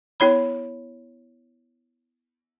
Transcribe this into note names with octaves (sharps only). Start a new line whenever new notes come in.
B3 E4 C#5 B5